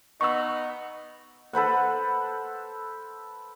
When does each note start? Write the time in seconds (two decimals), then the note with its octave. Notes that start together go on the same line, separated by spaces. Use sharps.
0.21 B3 D#4 B4 C#6 E6
1.53 A4 B4 C5 F#5